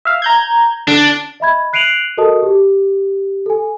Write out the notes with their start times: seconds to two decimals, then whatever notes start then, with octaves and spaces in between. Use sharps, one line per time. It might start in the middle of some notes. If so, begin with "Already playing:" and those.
0.05 E5 F5
0.22 A#5 G6 G#6
0.88 D3 D4
1.40 D#5 E5 B5 G#6
1.73 F#6 C7 D7 D#7 F7 F#7
2.17 F#4 A4 A#4 D#5 A5 D#6
2.43 G4
3.46 A4 G#5